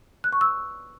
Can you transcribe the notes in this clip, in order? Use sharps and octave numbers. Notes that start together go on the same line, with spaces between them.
F#6
C#6
E6